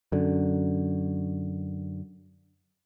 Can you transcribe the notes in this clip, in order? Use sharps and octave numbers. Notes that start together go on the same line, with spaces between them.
F#2 D3